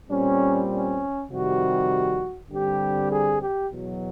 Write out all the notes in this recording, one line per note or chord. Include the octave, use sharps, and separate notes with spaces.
A#2 G3 C4 C#4
C#4
F2 C3 D#3 G3 F#4
G2 D3 G3 C4 G4
G#4
G4
E2 B2 F#3